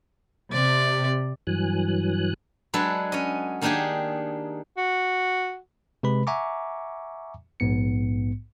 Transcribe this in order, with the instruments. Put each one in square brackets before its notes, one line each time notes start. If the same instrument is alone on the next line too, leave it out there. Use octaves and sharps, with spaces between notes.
[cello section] C3 [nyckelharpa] D5
[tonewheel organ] G2 E3 F#3 G#5 F#6
[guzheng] F#3 G#3 D4 A4 B4
C#4 D#5
D#3 A#3 D4 D#4 G4 G#4
[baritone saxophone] F#4
[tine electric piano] C3 G#3 B4 B5
E5 F#5 G#5 A#5 C#6 D6
A#1 G#2 B3 C#7